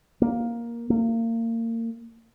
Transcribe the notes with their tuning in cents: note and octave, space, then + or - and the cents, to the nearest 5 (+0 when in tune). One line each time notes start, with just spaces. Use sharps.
A#3 +10
A#3 -30